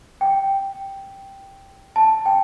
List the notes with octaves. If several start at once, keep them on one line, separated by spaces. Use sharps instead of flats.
G5
A5
G5